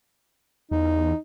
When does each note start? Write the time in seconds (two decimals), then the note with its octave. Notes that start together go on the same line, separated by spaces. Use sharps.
0.71 E2 D#4